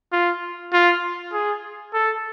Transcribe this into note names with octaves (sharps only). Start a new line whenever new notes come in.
F4
F4
G#4
A4